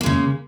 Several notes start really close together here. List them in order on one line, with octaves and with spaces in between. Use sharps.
A#3 G#3 C#3